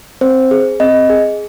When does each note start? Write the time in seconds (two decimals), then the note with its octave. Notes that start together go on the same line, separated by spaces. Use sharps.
0.21 C4 C5
0.51 G#4
0.80 C4 D#5
1.09 G#4